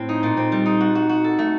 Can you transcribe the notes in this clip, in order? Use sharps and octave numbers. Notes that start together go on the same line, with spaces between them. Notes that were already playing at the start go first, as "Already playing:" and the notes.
Already playing: A2 C4
D#4
A#2
C4
G3
D#4
F#4
F#4
F#4
A4
A3